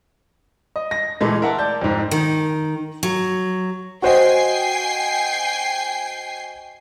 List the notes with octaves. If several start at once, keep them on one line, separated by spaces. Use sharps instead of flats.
D#5
A#6
A#2 E3 G#3 A3
A#4 E5 F#5 A5
D5 A5 G6
F2 G#2
D#3
F#3
F#4 C5 D#5 G5 G#5 C7